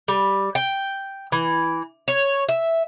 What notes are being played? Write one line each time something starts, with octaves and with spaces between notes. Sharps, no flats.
G3
G5
E3
C#5
E5